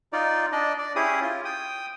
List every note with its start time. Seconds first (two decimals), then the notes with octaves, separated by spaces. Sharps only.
0.13 D#4 F4 D5
0.52 D4 D5 D#5
0.78 D5
0.96 C#4 E4 G4 G#4 D#6
1.22 F4
1.45 G5 D#6